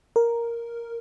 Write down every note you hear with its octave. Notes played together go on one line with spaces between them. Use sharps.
A#4